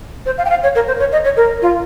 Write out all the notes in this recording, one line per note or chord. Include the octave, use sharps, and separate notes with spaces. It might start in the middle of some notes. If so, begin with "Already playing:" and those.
C5
F5
G5
F5
C#5
A#4
C5
C#5
D#5
C#5
A#4
F4